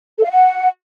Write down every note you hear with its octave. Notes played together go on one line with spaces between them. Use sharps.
A4
F5
F#5